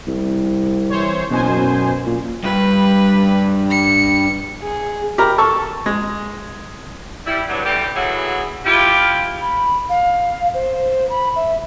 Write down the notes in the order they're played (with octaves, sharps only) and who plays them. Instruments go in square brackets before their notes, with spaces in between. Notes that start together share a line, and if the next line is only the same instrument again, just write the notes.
[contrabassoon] C2
[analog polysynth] E3 C5 C#5
[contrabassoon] F#1 [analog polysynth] B2 C5 G#5
[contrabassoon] F#2
A#2
[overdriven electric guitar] G2 [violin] B4
[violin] C#7
[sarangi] G#4
[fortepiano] G4 A#4 A#5 B5
A4 A5 C#6 E6
G#3
[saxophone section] G3 E4
G2 F#3
D2 E3 G3 G4
A2 E3 F#3 E4 F#4 G#4
E4 F4 G4
[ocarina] B5
F5
C5
B5
E5